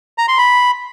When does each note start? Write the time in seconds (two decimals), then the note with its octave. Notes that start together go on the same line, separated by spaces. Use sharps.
0.18 A#5
0.28 C6
0.38 B5